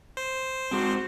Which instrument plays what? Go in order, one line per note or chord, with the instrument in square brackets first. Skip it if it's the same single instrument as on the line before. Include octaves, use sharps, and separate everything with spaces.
[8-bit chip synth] C5
[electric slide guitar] G#3 C4 [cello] F#4